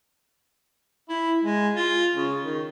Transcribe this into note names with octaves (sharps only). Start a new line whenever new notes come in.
E4
G#3
F4
C#3
D#3